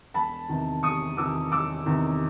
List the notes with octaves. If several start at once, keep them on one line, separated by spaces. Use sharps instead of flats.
E1 A5 B5
E2 C3 D#3
E1 C#6 D#6
E2 C3 D#3 D6 E6
E1 D6 E6
E2 C3 D#3